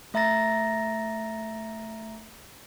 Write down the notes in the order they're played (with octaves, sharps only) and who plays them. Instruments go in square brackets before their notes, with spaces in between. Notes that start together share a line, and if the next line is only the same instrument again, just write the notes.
[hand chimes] A3 E5 A#5 A6 A#6